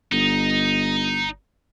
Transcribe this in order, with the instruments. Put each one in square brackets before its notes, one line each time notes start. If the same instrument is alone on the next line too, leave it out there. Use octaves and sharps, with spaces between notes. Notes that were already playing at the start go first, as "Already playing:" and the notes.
[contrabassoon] G1 [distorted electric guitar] D#4